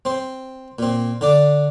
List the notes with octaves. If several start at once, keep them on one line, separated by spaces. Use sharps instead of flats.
C4 C5
A#2 C4
D3 D4 D5